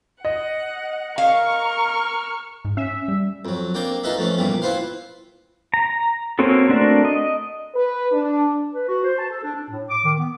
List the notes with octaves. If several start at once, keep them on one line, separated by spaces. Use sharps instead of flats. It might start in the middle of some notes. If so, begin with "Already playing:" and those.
D#5 F#5
A#4 F5 C#6 F6
G#2
C#4 E5
G3
F2 F#3
A#3 C4 D4 G5
D#4 F4 A4 B4 D#5 E5
F3 A3 C#4
A#2 E3 G3 B3
E4 F4 B4 C5 F5
A#5
A#3 C4 C#4 F#4 A4
A3 C4 D4 F#4 A#4
D#5
B4
D4
B4
F#4
C5
A5
A4
D4
D4
A2
D6
D#3
B3